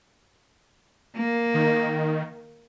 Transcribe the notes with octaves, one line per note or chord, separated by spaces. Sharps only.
A#3
D#3